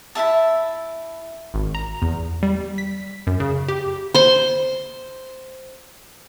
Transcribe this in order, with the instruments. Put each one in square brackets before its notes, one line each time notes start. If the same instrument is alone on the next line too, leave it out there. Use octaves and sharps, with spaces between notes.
[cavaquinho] E4 G#4 E5 A5
[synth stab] G#1
A#5
E2
G3
B6
F#2
C#3
G4
[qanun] C5 C6